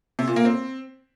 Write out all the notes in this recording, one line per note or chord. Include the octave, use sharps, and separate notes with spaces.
C3
A#2
A#3
C4